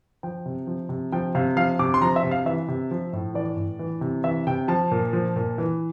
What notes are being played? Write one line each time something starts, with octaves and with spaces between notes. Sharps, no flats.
F3 G5
C3
F3
C3
F3 G5
C3 F5
F3 F5
C3 D6
C6
F3 A#5
E5
C3
F5
E3 E5
C3
F3
A2
E3 D5
A2
E3
C3
E3 E5
C3 G5
F3 A5
A#2
F3
A#2
E3